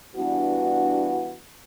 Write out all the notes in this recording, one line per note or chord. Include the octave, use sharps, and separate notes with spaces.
G2 E3 B3 D4 F#4